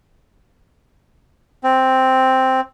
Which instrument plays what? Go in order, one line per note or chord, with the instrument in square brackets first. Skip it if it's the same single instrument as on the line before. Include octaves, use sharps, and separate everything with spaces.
[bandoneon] C4